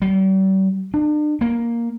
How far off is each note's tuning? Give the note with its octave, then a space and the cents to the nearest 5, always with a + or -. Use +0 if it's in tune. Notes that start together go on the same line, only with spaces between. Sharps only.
G3 -40
D4 +40
A#3 +5